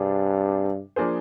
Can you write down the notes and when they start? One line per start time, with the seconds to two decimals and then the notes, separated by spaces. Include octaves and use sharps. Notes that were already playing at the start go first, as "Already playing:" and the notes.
Already playing: G2 C3 G3 D4 G#4
0.96 F3 A#3 D4 G#4 C5